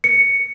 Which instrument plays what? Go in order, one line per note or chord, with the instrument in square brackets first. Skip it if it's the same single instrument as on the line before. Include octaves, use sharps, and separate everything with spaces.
[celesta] C#7